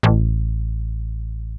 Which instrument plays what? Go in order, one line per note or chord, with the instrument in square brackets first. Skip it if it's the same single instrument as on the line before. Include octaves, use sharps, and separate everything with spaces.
[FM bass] A1